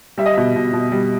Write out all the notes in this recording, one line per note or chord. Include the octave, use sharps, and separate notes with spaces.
G3 E5
D#5
B2 E5
B2
B2
G3